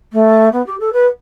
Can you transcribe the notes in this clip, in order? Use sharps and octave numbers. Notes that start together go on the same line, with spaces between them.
A3
B3
G4
A4
B4